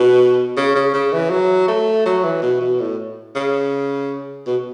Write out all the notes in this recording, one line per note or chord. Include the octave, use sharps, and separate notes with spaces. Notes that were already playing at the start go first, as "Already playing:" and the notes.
Already playing: B2
C#3
C#3
C#3
E3
F#3
A3
F#3
E3
B2
B2
A2
C#3
B2